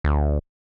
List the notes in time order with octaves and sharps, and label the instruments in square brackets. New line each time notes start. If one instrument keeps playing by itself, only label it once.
[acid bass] D2